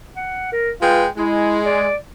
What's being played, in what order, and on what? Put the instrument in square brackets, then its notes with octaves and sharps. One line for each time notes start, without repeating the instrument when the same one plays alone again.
[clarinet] F#5
A#4
[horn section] G#3 F4 G5 [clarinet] B4
[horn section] G#3 [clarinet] E4
[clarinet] D5